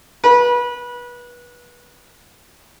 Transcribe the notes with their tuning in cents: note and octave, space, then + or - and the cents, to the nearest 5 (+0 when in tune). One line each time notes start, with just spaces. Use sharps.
B4 -25